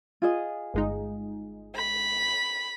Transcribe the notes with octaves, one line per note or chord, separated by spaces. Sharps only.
F4 G#4 D#5
G1 G#3 D#4
B5